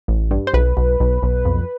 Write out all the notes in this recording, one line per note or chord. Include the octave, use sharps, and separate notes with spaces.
A1
G2
C5
B1 B4
B1
B1
B1
F2